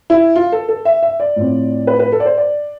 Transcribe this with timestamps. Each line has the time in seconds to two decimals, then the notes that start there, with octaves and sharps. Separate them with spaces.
0.10 E4
0.36 F4
0.52 A4
0.69 A4
0.85 E5
1.03 E5
1.20 D5
1.36 A2 F3 C4
1.87 B4
1.99 B4
2.12 A4
2.20 D5
2.26 C5
2.38 D5